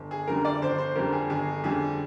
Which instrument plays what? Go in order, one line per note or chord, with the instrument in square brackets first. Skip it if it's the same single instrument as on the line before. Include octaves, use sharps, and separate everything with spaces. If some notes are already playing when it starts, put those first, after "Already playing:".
Already playing: [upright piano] G1
G#4
F2 D3 G3 A#4
D5
G1 C5
C5
F2 D3 G3 A#4
G#4
G1 G#4
F2 D3 G3 G#4